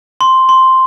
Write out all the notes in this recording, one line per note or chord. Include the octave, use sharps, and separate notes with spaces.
C6
C6